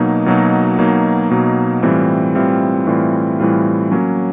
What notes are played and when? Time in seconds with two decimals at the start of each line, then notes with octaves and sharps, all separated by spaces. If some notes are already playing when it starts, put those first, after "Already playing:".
Already playing: B2 F#3 A#3 D#4
0.26 B2 F#3 A#3 D#4
0.79 B2 F#3 A#3 D#4
1.31 B2 F#3 A#3 D#4
1.82 A2 E3 G3 C4 F4
2.35 A2 E3 G3 C4 F4
2.87 A2 E3 G3 C4 F4
3.40 A2 E3 G3 C4 F4
3.91 F#3 A#3 C#4